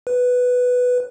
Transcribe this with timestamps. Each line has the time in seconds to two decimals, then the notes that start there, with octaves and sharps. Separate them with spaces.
0.07 B4